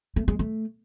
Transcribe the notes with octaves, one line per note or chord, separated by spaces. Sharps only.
A3
G#3
A3